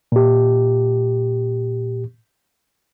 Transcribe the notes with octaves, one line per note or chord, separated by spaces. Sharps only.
A#2 G4